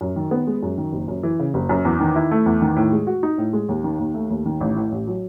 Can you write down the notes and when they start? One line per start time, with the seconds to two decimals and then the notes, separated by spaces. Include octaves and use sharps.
0.01 F#2
0.16 D#3
0.31 B3
0.47 G#3
0.63 F#2
0.78 D#3
0.93 F#1
1.08 F#2
1.23 E3
1.39 C#3
1.54 F#1
1.69 F#2
1.85 E2
2.00 D#3
2.16 E4
2.31 A3
2.46 E2
2.62 D#3
2.76 A2
2.92 G#3
3.07 F#4
3.23 D#4
3.38 A2
3.53 G#3
3.69 D#2
3.84 D#3
3.99 D#2
4.14 A3
4.30 D#2
4.46 D#3
4.61 A1
4.76 A2
4.92 A1
5.07 F#3